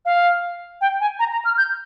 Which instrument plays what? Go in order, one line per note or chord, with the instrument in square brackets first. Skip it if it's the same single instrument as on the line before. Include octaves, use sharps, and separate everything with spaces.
[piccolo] F5
G5
G#5
A#5
A#5
F6
G6